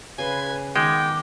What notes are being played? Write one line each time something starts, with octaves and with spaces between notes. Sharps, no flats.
C#3 B4 G#5 C6
D#3 G#3 B3 G5 G#5 D6